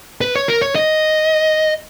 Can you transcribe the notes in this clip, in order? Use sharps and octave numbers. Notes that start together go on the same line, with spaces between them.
B4
C#5
A#4
C#5
D#5